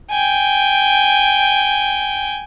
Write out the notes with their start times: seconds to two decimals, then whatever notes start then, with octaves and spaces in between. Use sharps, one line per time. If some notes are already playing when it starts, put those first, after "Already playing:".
0.11 G5 G#5